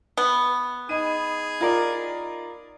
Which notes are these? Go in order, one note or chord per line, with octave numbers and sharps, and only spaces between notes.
B3
D#4 G#4 D#5 B5 D#7
F4 A#4 D5